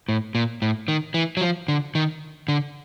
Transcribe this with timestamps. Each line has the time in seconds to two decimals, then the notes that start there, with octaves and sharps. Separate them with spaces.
0.09 A2
0.35 A#2
0.62 A2
0.88 D#3
1.14 E3
1.37 F#3
1.41 F3
1.68 D3
1.95 D#3
2.48 D3